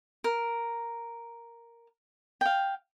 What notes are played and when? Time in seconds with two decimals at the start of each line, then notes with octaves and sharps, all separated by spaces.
0.24 A#4
2.41 F5 G5